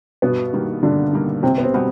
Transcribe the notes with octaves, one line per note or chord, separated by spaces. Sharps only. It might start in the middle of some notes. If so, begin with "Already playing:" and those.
G2 B2 B3
D#3 G3 A#3
G2 D3 D4
D#3 G3 A#3
C2 C3 C4
B3
C3 C4
B2 G3 B3